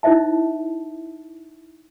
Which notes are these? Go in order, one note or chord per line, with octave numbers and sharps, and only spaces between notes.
D#4 E4 C5 D#5 E5 A5